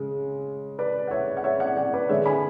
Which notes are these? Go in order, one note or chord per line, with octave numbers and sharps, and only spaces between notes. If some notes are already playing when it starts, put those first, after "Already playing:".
Already playing: C#3 G#3
B4 D5
F#5
C#5 E5
F#5
C#5 E5
D5 F#5
D5 F#5
B4 D5
D3 G#3 C#5 E5
G#5 B5